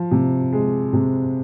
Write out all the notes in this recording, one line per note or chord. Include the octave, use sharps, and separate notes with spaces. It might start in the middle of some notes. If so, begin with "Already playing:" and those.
Already playing: F3
C3
G#3
C3